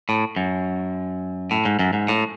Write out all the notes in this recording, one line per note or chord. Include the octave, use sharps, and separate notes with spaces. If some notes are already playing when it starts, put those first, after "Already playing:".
A2
F#2
A2
G#2
F#2
G#2
A2